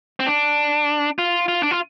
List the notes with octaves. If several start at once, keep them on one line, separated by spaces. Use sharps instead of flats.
C4
D4
F4
F4
D4
F4